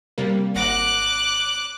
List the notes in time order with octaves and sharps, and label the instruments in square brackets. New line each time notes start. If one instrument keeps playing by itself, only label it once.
[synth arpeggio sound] C3 G3 A#3
[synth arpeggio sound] G#1 F#5 A#6 [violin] D6 F#6